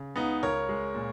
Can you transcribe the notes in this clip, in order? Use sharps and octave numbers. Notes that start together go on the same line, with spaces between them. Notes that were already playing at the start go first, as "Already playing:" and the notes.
Already playing: C#3
C#2 B3 D#4
C#2 A#4 C#5
G#3
A#2